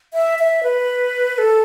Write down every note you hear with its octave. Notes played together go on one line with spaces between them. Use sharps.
E5
E5
B4
A4